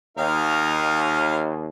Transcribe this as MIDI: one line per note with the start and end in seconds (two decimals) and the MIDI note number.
0.18 1.68 39
0.18 1.40 63
0.18 1.40 70
0.18 1.40 77